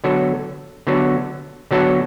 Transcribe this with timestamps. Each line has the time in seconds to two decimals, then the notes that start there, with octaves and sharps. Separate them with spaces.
0.04 D3 F#3 B3 F#4 A4
0.87 D3 F#3 B3 F#4 A4
1.71 D3 F#3 B3 F#4 A4